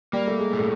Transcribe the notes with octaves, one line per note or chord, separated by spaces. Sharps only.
G3 A#3
A3
G#3
A2
A3